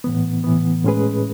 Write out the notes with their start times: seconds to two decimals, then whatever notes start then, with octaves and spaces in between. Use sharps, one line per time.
0.04 A2 E3 B3
0.44 A2 E3 B3
0.84 A2 G#3 C#4 G#4 B4